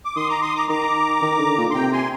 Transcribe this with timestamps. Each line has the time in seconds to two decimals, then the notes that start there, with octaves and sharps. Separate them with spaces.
0.05 D6
0.16 D#3 C6 D#6
0.29 A#5 D6
0.42 C6 D#6
0.56 A#5 D6
0.68 D#3 A#5 D6
1.22 D#3
1.39 D3
1.58 A#2
1.69 D3 C6
1.75 C3 G5 A#5
1.93 G#5 C6